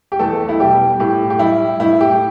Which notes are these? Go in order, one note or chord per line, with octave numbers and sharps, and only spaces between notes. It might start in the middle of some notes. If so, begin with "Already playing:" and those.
G4
E2 A3 A4
E4
B2 G3 G4
A2 G4
G4
G3 E4
A2 E4
G4